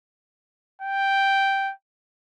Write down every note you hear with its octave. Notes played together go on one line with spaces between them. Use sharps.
G5